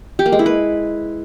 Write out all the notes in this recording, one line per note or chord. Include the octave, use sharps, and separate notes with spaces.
G4
A#3
G#3
E4
B4